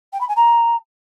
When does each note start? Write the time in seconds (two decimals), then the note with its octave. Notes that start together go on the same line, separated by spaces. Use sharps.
0.12 G5
0.20 B5
0.28 G#5
0.36 A#5